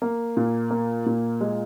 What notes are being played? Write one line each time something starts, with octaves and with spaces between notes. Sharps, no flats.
A#3
A#2
A#3
A#2
G#3